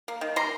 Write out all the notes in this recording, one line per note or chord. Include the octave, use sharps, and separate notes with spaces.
A#3
D#3
G3 A#5 C6